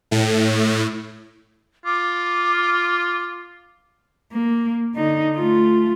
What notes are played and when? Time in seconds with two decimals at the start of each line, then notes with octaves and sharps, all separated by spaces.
0.11 A2
1.86 F4 D6
4.33 A#3
4.95 D3 D#4
5.37 A3 F4